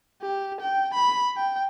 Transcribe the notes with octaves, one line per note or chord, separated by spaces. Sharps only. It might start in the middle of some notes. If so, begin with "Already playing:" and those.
G4
G5
B5
G5